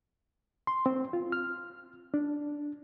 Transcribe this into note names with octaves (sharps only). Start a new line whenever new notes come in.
C6
C4
F4
F6
D4